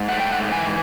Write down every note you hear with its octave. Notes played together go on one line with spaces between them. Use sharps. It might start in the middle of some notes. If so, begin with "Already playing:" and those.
Already playing: G#2
A3 F#5
G5
G#2 F#5
E3 G#5